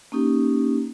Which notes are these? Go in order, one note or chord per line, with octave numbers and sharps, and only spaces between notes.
A#3 C#4 D#4 G4